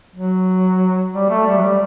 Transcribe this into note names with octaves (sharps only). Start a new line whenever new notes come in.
F#3
G3
A3
G3
F#3
G3